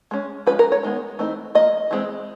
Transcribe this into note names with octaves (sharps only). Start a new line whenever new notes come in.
G#3 C#4
F3 G#3 C#4 B4
A#4
C#5
D#3 G#3 B3
E3 A3 C4 D#4
F3 A#3 D#5
E3 G#3 C4